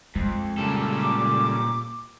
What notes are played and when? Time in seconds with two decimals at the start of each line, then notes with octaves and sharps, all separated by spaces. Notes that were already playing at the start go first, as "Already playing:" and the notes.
0.15 F2 G#3
0.58 A#2 C#3 G3 A4
1.00 D6